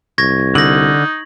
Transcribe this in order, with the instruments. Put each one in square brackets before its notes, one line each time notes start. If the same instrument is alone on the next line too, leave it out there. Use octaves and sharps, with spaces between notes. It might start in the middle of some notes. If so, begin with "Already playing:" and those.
[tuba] C2 [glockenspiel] C#6 G#6 A#6
[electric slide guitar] D3 [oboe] D#4 [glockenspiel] A#6 F#7